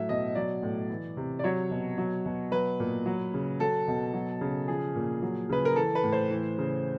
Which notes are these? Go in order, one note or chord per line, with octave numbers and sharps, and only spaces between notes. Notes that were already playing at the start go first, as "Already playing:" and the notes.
Already playing: A2 F#3 E5
B2 D#5
F#3 D5
A2
E3
C3
D5
F#3 C#5
B2
F#3
B2
F#3 B4
A#2
F#3
C#3
F#3 A4
B2
F#3
C#3
F3 G#4
A#2
F#3
C#3 B4
A#4
E3 A4
B4
A2
C5
E3
C#3